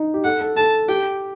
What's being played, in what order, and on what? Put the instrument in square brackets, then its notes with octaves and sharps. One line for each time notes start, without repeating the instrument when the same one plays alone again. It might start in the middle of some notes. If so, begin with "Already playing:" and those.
Already playing: [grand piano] D#4
G4
[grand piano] A4 [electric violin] F#5
[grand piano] A4
[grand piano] A4 [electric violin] A5
[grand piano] G4 [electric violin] G5